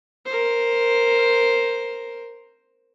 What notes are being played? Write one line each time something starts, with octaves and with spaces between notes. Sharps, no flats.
A#4 C5